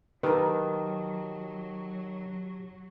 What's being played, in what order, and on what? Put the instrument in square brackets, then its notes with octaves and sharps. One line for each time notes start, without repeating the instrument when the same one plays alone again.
[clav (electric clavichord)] D#3 [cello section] F#3 [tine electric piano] G4 A5 [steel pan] A#4 B4